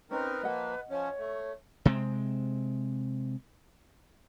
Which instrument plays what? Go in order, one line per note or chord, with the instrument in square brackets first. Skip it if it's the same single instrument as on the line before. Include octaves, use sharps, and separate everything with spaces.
[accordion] C4 D#4 A#4 [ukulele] C#4 [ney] B4
[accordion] F3 A#3 [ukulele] D#5 F#5
[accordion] F3 C#4 [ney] C#5
[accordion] A3
[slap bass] C3 G#3 C4